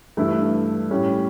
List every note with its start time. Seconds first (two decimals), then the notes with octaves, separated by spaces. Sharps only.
0.17 G2 E3 A3 E4
0.91 A2 G3 C#4